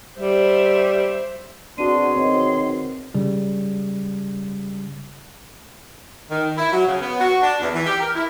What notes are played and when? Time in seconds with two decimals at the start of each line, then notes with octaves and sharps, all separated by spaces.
0.19 G3 C5 E5
1.78 B2 C4 D4 F#4 G#4 C6 D#7
2.16 D#3 C4 C#5 D#5
3.15 C#3 G3
6.30 D#3
6.57 E4
6.72 F#3
6.87 C#3
7.01 B3
7.20 F#4
7.42 D4
7.61 E2
7.74 E3
7.86 G4
8.00 A#4
8.14 E4